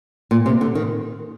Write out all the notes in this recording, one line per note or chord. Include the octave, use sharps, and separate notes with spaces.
A#2
C3
D3
D#3